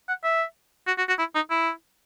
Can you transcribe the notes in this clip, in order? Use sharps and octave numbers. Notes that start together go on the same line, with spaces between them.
F#5
E5
F#4
F#4
F#4
E4
D#4
E4